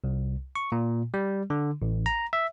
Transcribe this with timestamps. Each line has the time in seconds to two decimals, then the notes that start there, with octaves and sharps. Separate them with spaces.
0.04 C2
0.55 C#6
0.72 A#2
1.14 G3
1.50 D3
1.82 A1
2.06 A#5
2.33 E5